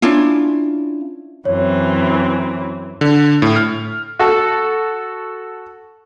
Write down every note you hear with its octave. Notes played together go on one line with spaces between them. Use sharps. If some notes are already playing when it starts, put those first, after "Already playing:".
C#4 D4 E4 F4
F#2 E3 C4 C#5
D3
A2
F6
F#4 A4